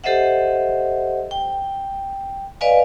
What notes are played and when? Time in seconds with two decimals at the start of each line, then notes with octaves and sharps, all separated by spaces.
0.04 G4 A4 C5 D#5 E5 F#5
1.31 G5
2.61 B4 D5 D#5 F5 G#5